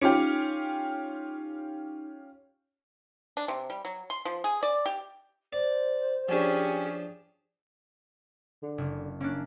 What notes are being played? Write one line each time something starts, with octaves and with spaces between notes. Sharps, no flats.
C#4 D#4 F4 G4 D6 C#7
D4
C3
G3
F#3
C6
F3
G#4
D5
G4
C5 D5
F3 C#4 D4 G4 G#4
D3
F#1
A#3 C#4 D4